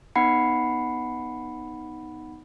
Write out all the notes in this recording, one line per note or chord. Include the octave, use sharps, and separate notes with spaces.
B3 D#4 F#5 B5 C7 C#7